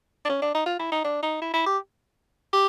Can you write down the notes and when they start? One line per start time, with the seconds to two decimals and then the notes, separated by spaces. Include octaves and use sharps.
0.25 D4
0.29 C#4
0.42 D4
0.54 D#4
0.66 F4
0.79 E4
0.92 D#4
1.04 D4
1.22 D#4
1.41 E4
1.53 E4
1.66 G4
2.53 G4